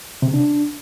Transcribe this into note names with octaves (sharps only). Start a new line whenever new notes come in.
C3
C#3
D4